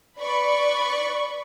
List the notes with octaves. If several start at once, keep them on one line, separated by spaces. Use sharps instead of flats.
B4 D5 B5 C#6